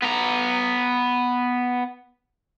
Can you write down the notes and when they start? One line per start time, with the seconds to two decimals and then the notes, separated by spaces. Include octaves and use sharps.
0.02 B3 A#5